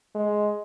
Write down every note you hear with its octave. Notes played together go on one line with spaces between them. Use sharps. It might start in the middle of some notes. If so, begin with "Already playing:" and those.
G#3